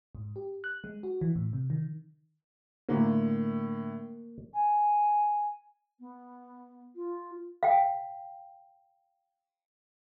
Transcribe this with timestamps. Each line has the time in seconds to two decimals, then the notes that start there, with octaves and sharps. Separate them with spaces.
0.15 G#2
0.36 G4
0.64 F#6
0.84 G#3
1.03 F#4
1.21 E3
1.36 A2
1.53 C3
1.70 D#3
2.89 A2 D3 A#3
4.54 G#5
6.00 B3
6.95 F4
7.63 F5 G5